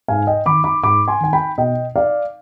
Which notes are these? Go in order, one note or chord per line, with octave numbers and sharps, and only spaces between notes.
G#2 F5 G#5
D#5 G5
D#3 B5 D6
B5 D6
G#2 B5 D6
G#5 C6
D#3 G#5
G5 B5
B2 D#5 G5
D5 F5